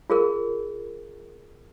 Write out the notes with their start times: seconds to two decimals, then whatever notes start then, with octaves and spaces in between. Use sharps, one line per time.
0.10 F4 G#4 A#4